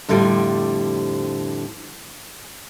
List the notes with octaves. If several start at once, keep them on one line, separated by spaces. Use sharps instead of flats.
F2 A2 D3 F3 G3